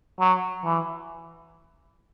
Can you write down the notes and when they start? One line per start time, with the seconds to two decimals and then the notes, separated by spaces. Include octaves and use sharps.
0.20 F#3
0.65 E3